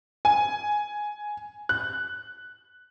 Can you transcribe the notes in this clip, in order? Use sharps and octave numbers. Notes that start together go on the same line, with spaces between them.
G#5
F#6